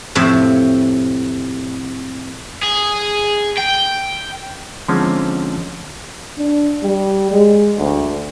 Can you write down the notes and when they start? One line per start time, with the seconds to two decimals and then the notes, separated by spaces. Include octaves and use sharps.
0.15 F2 A2 C3 E5
2.63 G#4
3.57 G5
4.88 D3 F3 G#3 A#3 C4 C#4
6.37 D4
6.83 G3
7.31 G#3
7.78 D2